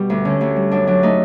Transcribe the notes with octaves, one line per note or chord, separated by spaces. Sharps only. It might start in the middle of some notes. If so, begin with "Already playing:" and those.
Already playing: B2 G3
D2
D3 C#4
D2
G3
F#2 D4
F#3 D4
A3 D#4